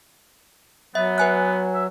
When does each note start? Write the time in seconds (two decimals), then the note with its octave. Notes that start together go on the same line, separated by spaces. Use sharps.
0.95 F#3 B3 E5
1.18 B4 G#5 F#6
1.74 E5